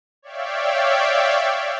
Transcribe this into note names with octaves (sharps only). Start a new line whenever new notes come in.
C#5 D5 E5 F5 G5